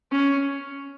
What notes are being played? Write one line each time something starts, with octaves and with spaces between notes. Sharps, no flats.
C#4